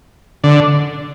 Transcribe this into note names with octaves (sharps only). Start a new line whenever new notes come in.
D3